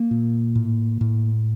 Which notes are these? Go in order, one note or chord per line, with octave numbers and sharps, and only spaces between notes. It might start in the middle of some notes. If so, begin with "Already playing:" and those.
Already playing: A#3
A#2
A2
A2